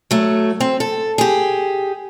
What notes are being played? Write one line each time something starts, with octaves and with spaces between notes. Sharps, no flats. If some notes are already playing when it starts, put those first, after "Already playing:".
F#3 A3
C4
A4
G4 G#4